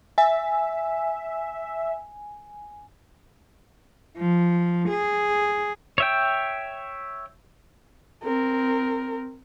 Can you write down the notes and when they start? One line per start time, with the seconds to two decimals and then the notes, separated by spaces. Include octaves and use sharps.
0.18 E5 G#5
4.17 F3
4.89 G#4
5.98 C#5 E5 G5
8.24 C4 A#4